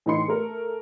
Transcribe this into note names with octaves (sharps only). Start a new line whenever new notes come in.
A2 E3 D#4 B4 C6 C#7
A3 A#4